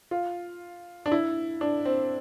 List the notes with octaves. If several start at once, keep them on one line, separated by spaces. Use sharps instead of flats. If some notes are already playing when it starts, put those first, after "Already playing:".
F4
D4
E4
D4
C4